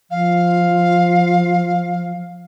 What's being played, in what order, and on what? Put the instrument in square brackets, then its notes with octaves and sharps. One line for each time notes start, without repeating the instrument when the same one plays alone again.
[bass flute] F3 [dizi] F5